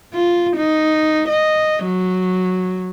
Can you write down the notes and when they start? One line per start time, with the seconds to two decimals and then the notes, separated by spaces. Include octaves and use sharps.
0.14 F4
0.57 D#4
1.29 D#5
1.85 F#3